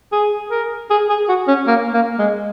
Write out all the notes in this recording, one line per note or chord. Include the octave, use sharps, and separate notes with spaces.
G#4
A#4
G#4
G#4
F#4
C#4
A#3
A#3
G#3